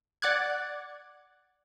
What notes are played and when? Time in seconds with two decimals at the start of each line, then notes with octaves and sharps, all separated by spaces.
0.22 D5 F#5 D6 F#6 G#6